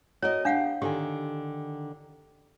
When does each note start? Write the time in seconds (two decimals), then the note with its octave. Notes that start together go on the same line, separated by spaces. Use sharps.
0.22 F#4 A#4 C#5 D#5
0.45 B3 D4 G4 F5 F#5
0.82 D3 D#3 G4 G#5